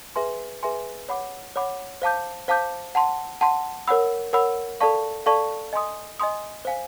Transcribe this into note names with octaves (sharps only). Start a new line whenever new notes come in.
G#4 B4 E5 G#5 C6
G#4 B4 E5 G#5 C6
C#5 F#5 B5 D6
C#5 F#5 B5 D6
C5 F5 A5 D6 G6
C5 F5 A5 D6 G6
F#5 A5 C6
F#5 A5 C6
A#4 C#5 F#5 B5 E6
A#4 C#5 F#5 B5 E6
A4 D5 F5 A5 C#6
A4 D5 F5 A5 C#6
D#5 G#5 C6 D#6
D#5 G#5 C6 D#6
C5 F5 G#5